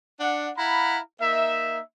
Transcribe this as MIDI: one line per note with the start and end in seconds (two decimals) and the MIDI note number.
0.19 0.49 62
0.19 0.49 74
0.19 0.49 78
0.57 0.99 64
0.57 0.99 77
0.57 0.99 78
0.57 0.99 82
0.57 0.99 83
1.21 1.79 58
1.21 1.79 63
1.21 1.79 76